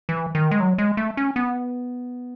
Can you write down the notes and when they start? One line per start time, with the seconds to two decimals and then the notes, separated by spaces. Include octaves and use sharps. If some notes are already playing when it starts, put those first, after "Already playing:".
0.09 E3
0.35 D#3
0.51 G#3
0.60 F#3
0.78 G#3
0.97 A3
1.17 C#4
1.36 B3